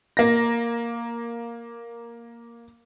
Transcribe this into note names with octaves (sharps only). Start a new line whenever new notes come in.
A#3 A#6